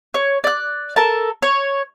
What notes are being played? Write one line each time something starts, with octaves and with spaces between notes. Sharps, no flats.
C#5
D5 F#6
A4 A#4 A5
C#5